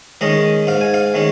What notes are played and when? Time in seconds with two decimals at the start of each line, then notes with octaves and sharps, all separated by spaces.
0.21 D#3 G#3 C#4 D#5
0.67 G#2 F5
0.81 G#5
0.94 F5
1.14 D#3 G#3 C#4